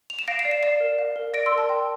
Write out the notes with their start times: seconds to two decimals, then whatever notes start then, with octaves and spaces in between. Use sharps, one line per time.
0.10 F7
0.19 E7
0.28 F5 A#6 D7
0.39 C7 E7
0.45 D5
0.51 C7 E7
0.63 D5 C7 E7
0.80 A#4
0.98 F5
1.16 A#4
1.34 D5 A#6 D7
1.46 C6 E6
1.52 A#4
1.58 A5 C6
1.69 G5